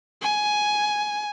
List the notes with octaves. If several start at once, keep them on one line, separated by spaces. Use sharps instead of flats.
G#5